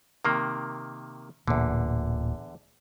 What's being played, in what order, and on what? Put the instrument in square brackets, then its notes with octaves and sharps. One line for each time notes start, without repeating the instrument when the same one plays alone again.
[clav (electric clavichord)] C3 D#3 A#3
[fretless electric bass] D1 A#2 [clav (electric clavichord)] E2 D3